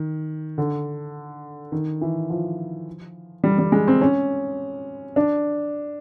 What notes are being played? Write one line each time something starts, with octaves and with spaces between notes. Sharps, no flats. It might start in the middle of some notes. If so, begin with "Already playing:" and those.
Already playing: D#3
D3
D#3
E3
F3
G3
G3
G#3
C4
C#4
D4